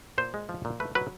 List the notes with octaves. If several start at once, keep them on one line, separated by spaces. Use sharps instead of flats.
A#2 C5
G#3
F3
A#2
A3 B4
F#3 B4